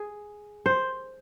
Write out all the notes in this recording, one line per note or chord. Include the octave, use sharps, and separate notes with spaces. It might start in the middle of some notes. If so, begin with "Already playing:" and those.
Already playing: G#4
C5